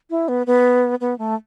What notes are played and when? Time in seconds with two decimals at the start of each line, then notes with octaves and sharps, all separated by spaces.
0.10 E4
0.28 B3
0.47 B3
1.01 B3
1.19 A3